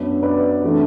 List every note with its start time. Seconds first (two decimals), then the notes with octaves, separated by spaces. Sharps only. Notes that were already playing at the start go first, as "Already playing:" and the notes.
Already playing: F#2 F#3 B3 D4
0.23 B4 D5
0.62 C3 E3 A3 D4